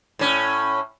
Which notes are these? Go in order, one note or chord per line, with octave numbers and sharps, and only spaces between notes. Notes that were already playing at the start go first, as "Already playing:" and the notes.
A2 C#4